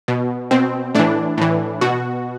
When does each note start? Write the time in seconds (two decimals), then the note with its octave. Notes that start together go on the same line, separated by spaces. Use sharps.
0.08 B2
0.51 B2 C4
0.95 A2 E3 D4
1.38 A2 E3
1.81 B2 F#4